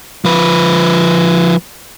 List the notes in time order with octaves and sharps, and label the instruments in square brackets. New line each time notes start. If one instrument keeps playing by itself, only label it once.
[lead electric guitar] F3 B4